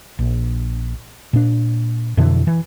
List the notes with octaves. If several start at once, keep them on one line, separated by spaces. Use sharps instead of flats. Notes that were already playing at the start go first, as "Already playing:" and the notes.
A#1
A#2 D4
F2 B2 D3 E3
E3